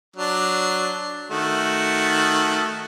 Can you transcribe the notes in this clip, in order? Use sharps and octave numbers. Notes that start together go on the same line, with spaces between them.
F#3 D4
D#3 A3 F#4